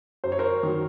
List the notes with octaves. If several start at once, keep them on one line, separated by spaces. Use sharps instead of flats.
F#2 C5
C#5
A#4 C5
D#3 F#3